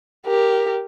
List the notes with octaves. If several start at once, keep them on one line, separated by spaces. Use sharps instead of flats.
G4 A#4